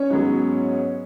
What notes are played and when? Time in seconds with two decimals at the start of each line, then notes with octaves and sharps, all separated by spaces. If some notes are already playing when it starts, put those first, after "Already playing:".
Already playing: C#4 C#5
0.10 G#2 F#3 B3